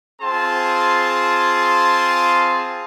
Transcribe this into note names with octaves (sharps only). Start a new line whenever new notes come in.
C4 F4 G#4 A5 C6